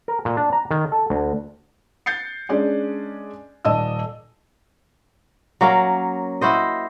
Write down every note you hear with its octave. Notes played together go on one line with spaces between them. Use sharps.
A#4
A#2
D4
A#5
D#3
A4
D2
G6 A6 C7 C#7
G#3 C#4 D4 D5 G#5
D#1 D5 D#5 A5 E6
F#3 A#3 C#4 F5
E4 F#4 C5 D#5